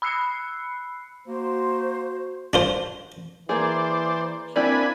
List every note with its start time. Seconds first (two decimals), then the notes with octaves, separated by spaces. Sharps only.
0.02 B5 E6 F#6 C7 C#7
1.28 A#3 F#4 C5
2.53 D4 F4 C5
3.49 E3 A#3 G#4 C5 D5
4.56 A#3 C4 D4 E4 D5 G#5 B5